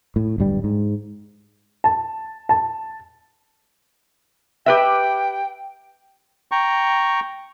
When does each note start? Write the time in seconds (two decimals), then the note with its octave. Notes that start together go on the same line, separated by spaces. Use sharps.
0.16 A2
0.38 D1 G2 G3
0.64 G#2
1.84 A5
2.49 A5
4.66 G4 B4 E5 G5
6.52 G5 A#5 C#6